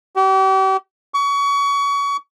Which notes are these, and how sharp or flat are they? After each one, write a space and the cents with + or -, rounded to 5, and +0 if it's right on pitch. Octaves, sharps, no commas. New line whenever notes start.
G4 -40
C#6 +30